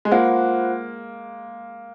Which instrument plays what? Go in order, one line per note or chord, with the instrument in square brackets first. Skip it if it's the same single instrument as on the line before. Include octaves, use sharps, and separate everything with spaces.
[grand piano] G#3
[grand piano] A#3 [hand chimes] F4 C5 F#5